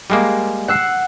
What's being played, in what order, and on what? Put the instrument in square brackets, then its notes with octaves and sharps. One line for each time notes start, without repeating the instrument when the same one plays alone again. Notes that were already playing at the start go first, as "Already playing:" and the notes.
[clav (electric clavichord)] G3 G#3 A#3
[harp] F#5 E6 C7